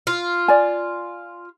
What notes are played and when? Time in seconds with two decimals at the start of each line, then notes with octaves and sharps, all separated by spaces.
0.07 F4
0.48 D5 G#5